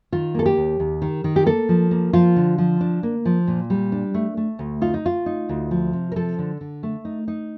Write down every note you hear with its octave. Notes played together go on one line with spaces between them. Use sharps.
D#3 F4
A#3 A4
G4
D#2
D#2
D#3
D#3
G4
A#3 A4
F3
A#3
F3 F4
D3
F3
D4
A#3
F3
A#2
G3
D4
A3
A3
D2
D#4 F4
D#4
A3 F4
D#4
D2
F3
C3
A#4
F3 A4
D3
D3
A3
D#4
D#4